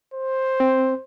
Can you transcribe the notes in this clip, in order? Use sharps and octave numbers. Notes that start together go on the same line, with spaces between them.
C5
C4